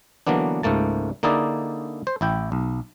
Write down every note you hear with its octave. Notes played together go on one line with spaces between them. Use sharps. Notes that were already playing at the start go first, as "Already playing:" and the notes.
D3 E3 F#3 A#3 B3 D4
C#2 G#2 A3 A#3 A5
D3 A#3 D#4 E4 G#4 D5
C5
A1 E4 G5
B1